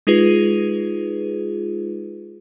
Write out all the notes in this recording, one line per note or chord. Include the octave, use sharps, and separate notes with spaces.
G#3 D#4 F4 G#4 B4